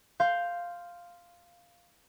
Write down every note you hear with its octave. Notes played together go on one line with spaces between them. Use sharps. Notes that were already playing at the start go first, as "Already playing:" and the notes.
F5 C6 G6